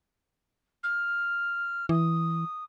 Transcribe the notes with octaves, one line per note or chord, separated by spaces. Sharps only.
F6
E3 D#6